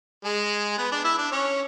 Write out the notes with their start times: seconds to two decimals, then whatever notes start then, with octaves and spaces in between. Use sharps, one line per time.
0.24 G#3 G#4
0.78 B3 B4
0.91 D4 D5
1.04 E4 E5
1.17 D4 D5
1.32 C#4 C#5